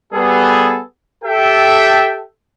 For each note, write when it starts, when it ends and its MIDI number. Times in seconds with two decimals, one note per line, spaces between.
0.13 0.80 55
0.13 0.80 59
0.13 0.80 68
0.13 0.80 69
1.24 2.22 67
1.24 2.22 69
1.24 2.22 76
1.24 2.22 79